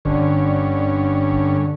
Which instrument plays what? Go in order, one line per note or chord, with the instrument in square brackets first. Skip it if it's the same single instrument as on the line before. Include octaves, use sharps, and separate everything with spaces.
[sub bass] G1 [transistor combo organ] G2 C#4 [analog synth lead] D3